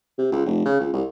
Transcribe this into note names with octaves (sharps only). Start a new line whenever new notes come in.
C3
C#2
F1
C#3
C#2
C2